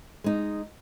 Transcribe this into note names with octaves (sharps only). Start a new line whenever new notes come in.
G#3 D#4